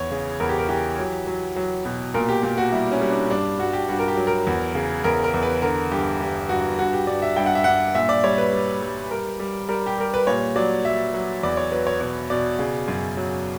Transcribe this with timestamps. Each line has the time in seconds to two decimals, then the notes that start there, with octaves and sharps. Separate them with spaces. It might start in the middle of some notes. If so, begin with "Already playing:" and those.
Already playing: E2 C#5
0.11 C#3
0.40 E2 A#4
0.49 G4
0.58 A#4
0.69 E3 G4
0.99 F#3
1.27 F#3
1.56 F#3
1.85 B2
2.14 A#2 A#4
2.29 G4
2.43 A#2 G4
2.58 F#4
2.72 G3 E4
2.92 C#4
3.01 G3
3.11 D4
3.30 G2 D4
3.59 G2 F#4
3.73 G4
3.88 G2 F#4
3.99 A#4
4.08 G4
4.17 F#3
4.27 A#4
4.47 E2
4.75 C#3
5.04 E2 A#4
5.24 A#4
5.34 E2
5.43 B4
5.62 D3 A#4
5.91 G2 G4
6.20 G2 G4
6.49 G2 F#4
6.79 G2 F#4
6.93 G4
7.07 G2 D5
7.22 E5
7.36 G2 G5
7.46 F#5
7.55 E5
7.64 G2 F#5
7.95 A#2 E5
8.09 D5
8.24 G3 C#5
8.38 B4
8.53 G3
8.82 G3
9.11 G3 A#4
9.39 G3
9.69 G3 A#4
9.86 G4
9.98 G3 A#4
10.14 B4
10.27 A#2 C#5
10.56 F#3 D5
10.85 F#3 E5
11.14 F#3
11.43 E2 D5
11.57 C#5
11.72 F#3 B4
11.87 C#5
12.01 B2 C#5
12.30 B2 D5
12.59 C#3
12.88 F#2
13.17 F#3